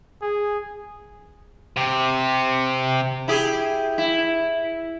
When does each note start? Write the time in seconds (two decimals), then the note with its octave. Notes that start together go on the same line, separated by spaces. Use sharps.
0.22 G#4
1.77 C3
3.28 E4 G4 G#4
3.98 E4